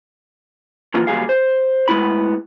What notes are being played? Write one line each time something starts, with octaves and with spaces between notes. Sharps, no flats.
D3 E3 F3 A#3 F4
D#2 A#2 F#3 G3 G#4 F5
C5
A2 G#3 B3 E4 B5